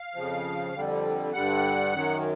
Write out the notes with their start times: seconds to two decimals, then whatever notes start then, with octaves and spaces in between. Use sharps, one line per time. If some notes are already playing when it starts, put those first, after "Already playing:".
Already playing: F5
0.14 F2 C#3 F3
0.74 F2 D3 G3
1.33 G2 D3 G3 F#5
1.93 F#2 D#3 F#3